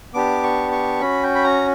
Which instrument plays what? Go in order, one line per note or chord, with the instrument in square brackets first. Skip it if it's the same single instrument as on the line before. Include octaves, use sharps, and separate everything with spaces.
[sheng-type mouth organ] B3 D4 G4 D6
C#6
C#6
C#4 F#4 B5
G5
B5
A#5